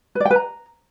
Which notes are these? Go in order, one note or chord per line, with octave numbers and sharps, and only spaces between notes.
B4
D5
G5
B4
A#5